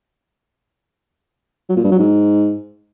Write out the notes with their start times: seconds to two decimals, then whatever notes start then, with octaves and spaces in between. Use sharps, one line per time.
1.69 F#3
1.77 A#2
1.84 G2
1.91 F#3
1.99 G#2